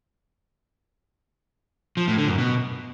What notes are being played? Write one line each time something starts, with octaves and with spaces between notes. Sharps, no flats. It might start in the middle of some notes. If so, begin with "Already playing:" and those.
F3
A2
D3
F#2
B2